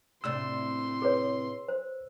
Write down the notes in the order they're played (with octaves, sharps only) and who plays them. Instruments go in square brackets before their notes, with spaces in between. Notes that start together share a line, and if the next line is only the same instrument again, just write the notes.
[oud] A2 C3 D4 [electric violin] C6 [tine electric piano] E6
[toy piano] G#4 B4 C#5
C5